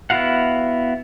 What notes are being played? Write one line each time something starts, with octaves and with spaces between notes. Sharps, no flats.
B3 E4 F#4 F5 F#5